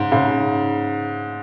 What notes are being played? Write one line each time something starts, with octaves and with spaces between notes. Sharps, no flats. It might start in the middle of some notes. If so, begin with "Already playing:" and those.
Already playing: G#2 C#3
G#2 C#3